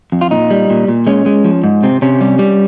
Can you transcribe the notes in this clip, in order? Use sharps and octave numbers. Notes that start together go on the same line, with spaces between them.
F2
F4
A#2 D#4
G3
A#2
A#2
G#3 C#4
G#3
F3
G#2
C3 C4
C3 C#4
G3
G3